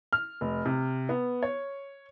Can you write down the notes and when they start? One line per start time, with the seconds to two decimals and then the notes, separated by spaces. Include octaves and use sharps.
0.13 F6
0.41 F1
0.66 C3
1.09 B3
1.43 C#5